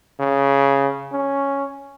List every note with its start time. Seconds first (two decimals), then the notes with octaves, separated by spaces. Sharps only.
0.20 C#3
1.12 C#4